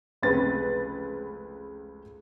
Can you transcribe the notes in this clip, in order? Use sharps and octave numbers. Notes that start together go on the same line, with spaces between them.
F1 C#2 C4 B4 A6